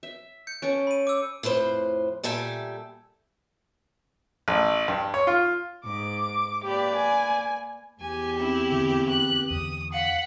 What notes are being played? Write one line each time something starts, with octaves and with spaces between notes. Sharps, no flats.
E5
G6 C#7
C#4 A4 A5 D7
B5 D#7
D6 E6
F2 A2 B4 C5
A#2 G3 A4 E5 G5 G#5
A1
G2
C#5
F4
G#2 D6
A#3 G4 B4 D5
G#5
E2 G4 G#5
C4 E4
D3
F#6
E2 D3 D#6
F5 F#5 B6